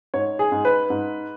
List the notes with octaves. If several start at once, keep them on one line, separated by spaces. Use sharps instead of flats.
G#2 C#5
G#4
G#2
B4
G#2